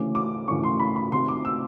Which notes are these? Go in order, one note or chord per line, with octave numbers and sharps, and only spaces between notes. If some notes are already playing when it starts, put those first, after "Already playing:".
Already playing: D2 C#3 E3 A3 C#4 D6
D6
D2 C#3 E3 A3 C#4 C#6
C6
B5
B5
D2 C3 D#3 C6
D6
E6